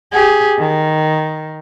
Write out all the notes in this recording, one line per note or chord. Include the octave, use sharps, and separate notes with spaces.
G4 G#4
D#3